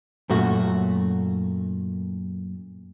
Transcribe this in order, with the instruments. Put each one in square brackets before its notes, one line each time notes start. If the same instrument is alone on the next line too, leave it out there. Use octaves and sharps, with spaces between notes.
[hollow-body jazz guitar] F#2 A#2 A3 F#4